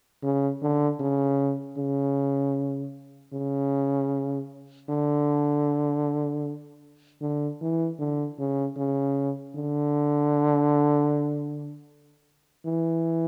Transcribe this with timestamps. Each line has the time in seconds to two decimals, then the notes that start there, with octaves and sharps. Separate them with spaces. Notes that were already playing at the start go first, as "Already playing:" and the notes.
0.23 C#3
0.62 D3
1.00 C#3
1.78 C#3
3.33 C#3
4.89 D3
7.21 D3
7.61 E3
7.99 D3
8.39 C#3
8.77 C#3
9.56 D3
12.66 E3